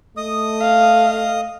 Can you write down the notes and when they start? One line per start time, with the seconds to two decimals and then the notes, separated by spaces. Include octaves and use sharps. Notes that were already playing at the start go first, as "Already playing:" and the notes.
0.17 A3 D#5 D#6
0.62 F5